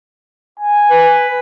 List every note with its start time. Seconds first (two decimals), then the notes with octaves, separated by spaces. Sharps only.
0.60 G#5
0.90 B4